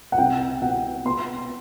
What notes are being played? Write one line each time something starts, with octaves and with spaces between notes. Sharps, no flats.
F#5
C2 G5
B2 F#5
B3 C6